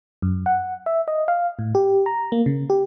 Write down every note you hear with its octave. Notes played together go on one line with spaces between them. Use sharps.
F#2
F#5
E5
D#5
F5
A2
G4
A#5
A#3
C#3
G4